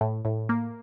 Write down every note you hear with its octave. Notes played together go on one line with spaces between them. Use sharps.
A2
A2
A#3